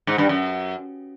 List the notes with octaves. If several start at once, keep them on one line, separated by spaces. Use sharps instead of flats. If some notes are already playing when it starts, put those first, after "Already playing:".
G#2
G2
F#2